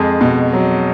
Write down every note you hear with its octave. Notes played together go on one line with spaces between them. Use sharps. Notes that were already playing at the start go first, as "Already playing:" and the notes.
Already playing: F2 G#3
B2
F#3